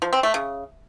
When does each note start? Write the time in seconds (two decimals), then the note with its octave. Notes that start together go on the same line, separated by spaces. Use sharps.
0.02 F3
0.13 C4
0.23 A3
0.34 C#3